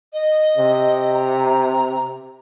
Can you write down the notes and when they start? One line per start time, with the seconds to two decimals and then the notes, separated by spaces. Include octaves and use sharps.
0.13 D#5
0.57 C3
1.14 A#5